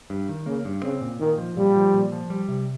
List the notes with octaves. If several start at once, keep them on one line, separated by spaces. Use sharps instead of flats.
G2
D#3
C#3 A#3
G2
C#3 C4
A#2
A#2 D#3
F3
A#2 G3
F3
A#2
F3
G3
C3